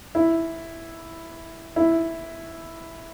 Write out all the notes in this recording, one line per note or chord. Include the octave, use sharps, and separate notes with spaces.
E4
E4